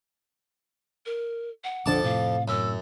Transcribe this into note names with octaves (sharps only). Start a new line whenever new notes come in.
A#4
F#5
A#1 F2 D3 D4 A5 D6
A2 C3 F5
F#2 E6